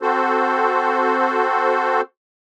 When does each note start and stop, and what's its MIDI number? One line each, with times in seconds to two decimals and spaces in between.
0.02 2.01 60
0.02 2.01 66
0.02 2.01 69
0.02 2.01 72